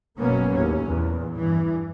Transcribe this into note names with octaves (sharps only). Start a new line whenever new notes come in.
F#1 B2 F#3 A#3 B3 C#4
D#2 A2 C#4
E2 A#2
G2 E3